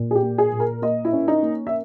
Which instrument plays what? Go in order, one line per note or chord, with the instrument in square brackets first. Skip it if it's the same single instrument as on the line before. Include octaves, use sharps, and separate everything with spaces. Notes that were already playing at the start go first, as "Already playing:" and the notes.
Already playing: [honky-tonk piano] A#2
G#4
G4
A#3
G#4
A#2
A#4
A#3 D#5
E4
C#4
D#4
A#3
E5